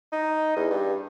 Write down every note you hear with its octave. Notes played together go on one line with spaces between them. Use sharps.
D#4
E2
G2